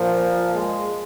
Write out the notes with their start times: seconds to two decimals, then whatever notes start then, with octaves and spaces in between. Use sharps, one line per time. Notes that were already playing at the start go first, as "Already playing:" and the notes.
Already playing: A#2 F3
0.18 A#3
0.54 G#3